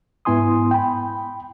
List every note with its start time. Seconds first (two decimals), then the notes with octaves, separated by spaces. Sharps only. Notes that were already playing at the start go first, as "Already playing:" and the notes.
0.25 G#2 B3 E4 G#5 C6 D#6
0.71 G5 B5